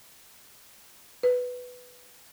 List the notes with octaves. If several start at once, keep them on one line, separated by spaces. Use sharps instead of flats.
B4